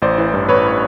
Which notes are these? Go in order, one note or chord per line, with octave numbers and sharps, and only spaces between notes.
A1 C5 D5
E3
G2
A1 B4 C#5